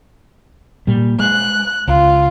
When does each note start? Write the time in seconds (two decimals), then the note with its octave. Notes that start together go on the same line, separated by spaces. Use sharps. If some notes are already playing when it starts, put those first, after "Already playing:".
0.87 A#2 G3
1.19 G#3 F#6
1.88 C#2 F4